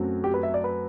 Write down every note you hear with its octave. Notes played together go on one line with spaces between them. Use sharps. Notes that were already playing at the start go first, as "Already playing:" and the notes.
Already playing: F#2 F#3 A3 C4
G4
B4
E5
D5
B4